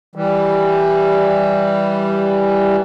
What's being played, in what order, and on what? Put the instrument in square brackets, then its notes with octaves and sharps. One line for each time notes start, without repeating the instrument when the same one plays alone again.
[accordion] E3 G3